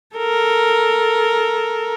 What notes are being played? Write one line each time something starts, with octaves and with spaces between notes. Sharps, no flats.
A4 A#4